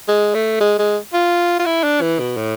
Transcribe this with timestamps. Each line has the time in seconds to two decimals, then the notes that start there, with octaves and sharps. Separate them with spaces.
0.08 G#3
0.34 A3
0.60 G#3
0.78 G#3
1.13 F4
1.59 F4
1.66 E4
1.83 D4
2.01 E3
2.19 B2
2.36 A2